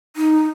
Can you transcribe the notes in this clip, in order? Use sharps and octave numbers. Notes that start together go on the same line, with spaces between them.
D#4